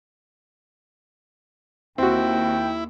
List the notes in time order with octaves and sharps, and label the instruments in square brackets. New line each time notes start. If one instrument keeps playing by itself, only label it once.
[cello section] D#2 [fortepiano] C4 F#4 [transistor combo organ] E4 [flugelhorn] G5